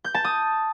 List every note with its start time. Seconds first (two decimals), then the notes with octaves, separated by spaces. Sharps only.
0.04 G6
0.14 A5
0.24 D#6